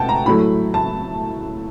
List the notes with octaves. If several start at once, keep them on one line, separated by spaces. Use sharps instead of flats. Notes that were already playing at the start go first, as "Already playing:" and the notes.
Already playing: B2 F#5 G5 A5
A#5
A2 F#3 A3 B5
A5